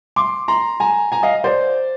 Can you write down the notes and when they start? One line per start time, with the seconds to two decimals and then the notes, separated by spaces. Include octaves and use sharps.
0.16 C6 D6
0.48 A#5 C6
0.80 G#5 A#5
1.12 G#5 A#5
1.23 D#5 F5
1.44 C5 D5